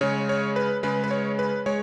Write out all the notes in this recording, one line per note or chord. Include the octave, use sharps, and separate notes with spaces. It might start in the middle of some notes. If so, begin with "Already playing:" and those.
C#3 G#3 C#5
C#5
B4
C#3 G#3 B4
B4
C#5
B4
G#3 C#5